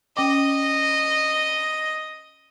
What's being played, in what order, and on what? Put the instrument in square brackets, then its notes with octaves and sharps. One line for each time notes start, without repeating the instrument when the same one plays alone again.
[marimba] C#4 G5 D6 [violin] D#5